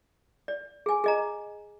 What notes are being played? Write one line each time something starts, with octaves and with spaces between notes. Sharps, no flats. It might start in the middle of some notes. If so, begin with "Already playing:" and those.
D5
G#4 G#5
G#4 D#5 A#5